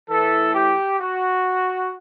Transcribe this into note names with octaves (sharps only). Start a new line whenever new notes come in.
A2 E3 A4
G4
F#4